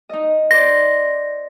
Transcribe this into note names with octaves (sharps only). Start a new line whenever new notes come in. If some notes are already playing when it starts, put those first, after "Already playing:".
D#4 D#5
C5 D5 A#6